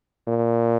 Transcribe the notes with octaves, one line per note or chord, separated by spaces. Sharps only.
A#2